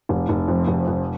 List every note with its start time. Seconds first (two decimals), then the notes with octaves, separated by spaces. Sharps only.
0.09 F1
0.29 F1
0.48 F2
0.67 F1
0.87 F2